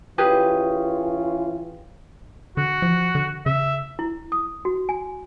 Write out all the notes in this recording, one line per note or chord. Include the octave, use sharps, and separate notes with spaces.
E3 C#4 F4 G4 G#4 B4
D3 F#4
F3
D3
C#3 E5
E4
D#6
F#4
G#5